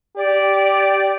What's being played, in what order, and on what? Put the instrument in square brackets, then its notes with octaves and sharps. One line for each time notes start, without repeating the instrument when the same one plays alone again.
[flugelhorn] G4 [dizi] D5